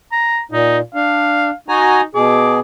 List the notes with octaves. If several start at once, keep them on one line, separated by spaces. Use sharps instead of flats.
A#5
A#2 D#4
D4 F5
D#4 F#4 G#5 A#5
B2 G#4 D6